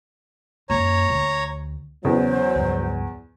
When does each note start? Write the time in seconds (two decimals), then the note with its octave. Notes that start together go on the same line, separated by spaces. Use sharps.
0.70 F#2 A#2 C#5 A#5
1.10 D2
2.05 E2 C#3 F#3 C5
2.56 C#2 G2 F3